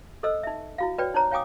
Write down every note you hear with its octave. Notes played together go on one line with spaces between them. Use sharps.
A4 C5 D#5 E6
D#4 E5
E4 F#4 F5
F#4 B4 C#5 D5 G5
D#4 C5 C#5 A#5
C#5 F5 G5 G#5 D6 D#6